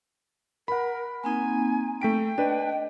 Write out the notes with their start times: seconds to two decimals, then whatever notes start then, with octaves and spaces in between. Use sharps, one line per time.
0.68 A#4 F#5 B5
1.24 A#3 C4 D#4 G#5
2.02 A3 G5 B6 D7
2.38 D4 B4 D#5